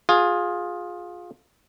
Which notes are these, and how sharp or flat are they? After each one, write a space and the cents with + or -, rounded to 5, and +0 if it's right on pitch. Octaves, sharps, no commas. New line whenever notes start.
F4 +20 G#4 +0